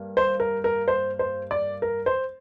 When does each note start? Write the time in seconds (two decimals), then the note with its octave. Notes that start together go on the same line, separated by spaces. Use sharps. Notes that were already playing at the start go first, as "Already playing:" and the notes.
Already playing: G2 A#3
0.17 C5
0.40 A#4
0.64 A#4
0.88 C5
1.19 C5
1.51 D5
1.82 A#4
2.06 C5